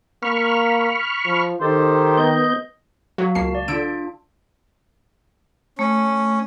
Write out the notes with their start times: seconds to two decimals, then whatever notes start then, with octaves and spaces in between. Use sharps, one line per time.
0.23 A#3 B5 C#6 F6
1.25 F3
1.61 D#3 G4 A4 C5
2.17 B3 D#5 G6
3.18 F#3 F#4 F5
3.35 C#2 A#3 A5 C7
3.55 D5
3.68 D3 D4 F4 E6 D7
5.79 A3 C#4